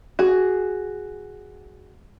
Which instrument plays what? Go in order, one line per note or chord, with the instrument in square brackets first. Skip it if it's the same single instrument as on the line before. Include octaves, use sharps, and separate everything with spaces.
[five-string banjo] F#4 G#4